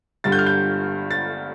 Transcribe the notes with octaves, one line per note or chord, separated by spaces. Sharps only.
G1 G2 D3 G3 A6
G6
F6
G6
A6